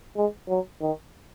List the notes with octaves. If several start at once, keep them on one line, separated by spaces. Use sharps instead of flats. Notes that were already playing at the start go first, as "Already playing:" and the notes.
G#3
F#3
D#3